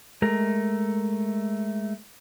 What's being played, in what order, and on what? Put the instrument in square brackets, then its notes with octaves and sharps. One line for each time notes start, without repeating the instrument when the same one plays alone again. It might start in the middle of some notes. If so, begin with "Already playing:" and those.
[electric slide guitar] G#3 A3 A#4